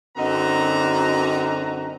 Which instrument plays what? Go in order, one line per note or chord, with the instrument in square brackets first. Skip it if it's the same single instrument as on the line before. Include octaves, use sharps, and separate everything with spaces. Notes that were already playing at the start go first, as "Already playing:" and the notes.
[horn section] F#2 D3 C4 D#4 F#4 A#5